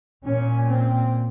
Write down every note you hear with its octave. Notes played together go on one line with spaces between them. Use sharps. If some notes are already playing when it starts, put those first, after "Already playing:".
A#2 C#4
C4